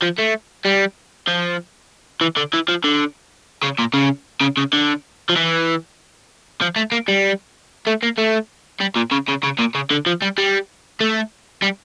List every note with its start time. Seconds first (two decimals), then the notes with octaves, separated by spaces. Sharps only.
0.02 F3
0.18 A3
0.65 G3
1.28 F3
2.21 E3
2.37 D3
2.54 E3
2.69 F3
2.84 D3
3.63 C#3
3.79 A#2
3.94 C#3
4.41 C#3
4.57 C#3
4.73 D3
5.29 F3
5.36 E3
6.61 F3
6.76 A3
6.92 A#3
7.08 G3
7.87 A3
8.03 A#3
8.18 A3
8.81 G3
8.96 A#2
9.11 C#3
9.28 C#3
9.43 C#3
9.59 A#2
9.75 C#3
9.91 D3
10.06 F3
10.22 G3
10.38 G3
11.01 A3
11.62 G3